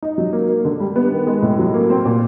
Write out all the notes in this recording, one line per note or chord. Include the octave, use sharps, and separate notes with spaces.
D#4
F#3
A#3
A#3
D3
G3
B3
D#3
G#3
A2
F#3
A#3
C4
A#2